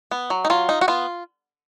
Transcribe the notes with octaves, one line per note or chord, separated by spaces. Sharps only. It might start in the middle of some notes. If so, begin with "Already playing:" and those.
B3
F#3
D#4
F#3 F4
D#4
F#4
B3 F4